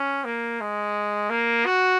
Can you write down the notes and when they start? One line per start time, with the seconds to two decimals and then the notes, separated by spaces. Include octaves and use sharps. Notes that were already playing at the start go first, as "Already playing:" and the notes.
Already playing: C#4
0.25 A#3
0.61 G#3
1.30 A#3
1.66 F#4